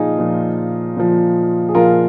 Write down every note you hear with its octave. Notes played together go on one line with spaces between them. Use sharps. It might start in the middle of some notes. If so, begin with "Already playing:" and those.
Already playing: A#2 F3 D#4 F4 G#4
A#2 F3
A#2 F3
G#4
A#2 F3 F4 A#4